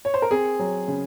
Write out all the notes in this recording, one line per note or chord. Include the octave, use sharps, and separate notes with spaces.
C#5
C5
A#4
C4 G#4
F#3
C#3